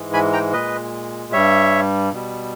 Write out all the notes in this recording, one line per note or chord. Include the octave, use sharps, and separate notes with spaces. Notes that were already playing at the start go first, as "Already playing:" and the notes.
Already playing: G#2 E3 G#3
G#5 B5
G5 A#5
A#2 G#3 B4 D#5
G2 G3 C#5 E5
B2 G3